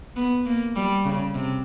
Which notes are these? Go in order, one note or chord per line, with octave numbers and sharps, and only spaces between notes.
B3
A#3
G3
C#3
C3